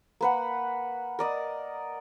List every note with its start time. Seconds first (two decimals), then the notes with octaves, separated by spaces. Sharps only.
0.21 A#3 B4 F#5
1.19 A#4 D5 D#5